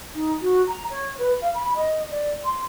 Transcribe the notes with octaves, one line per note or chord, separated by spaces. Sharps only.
D#4
F#4
A#5
C#5
B4
F5
B5
D#5
D5
C6